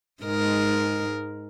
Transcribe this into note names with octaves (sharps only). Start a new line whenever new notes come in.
G#2 G#3 A#4